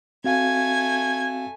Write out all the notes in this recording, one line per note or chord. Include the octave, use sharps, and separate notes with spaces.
A3 C4 F#4 F5 G#5 G#6